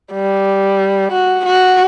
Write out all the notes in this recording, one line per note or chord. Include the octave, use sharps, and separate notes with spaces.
G3
F#4
F#4